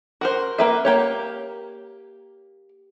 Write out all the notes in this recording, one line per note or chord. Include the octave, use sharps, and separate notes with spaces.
F#4 A#4 C5
A#3 B4 E5
A#3 G4 C#5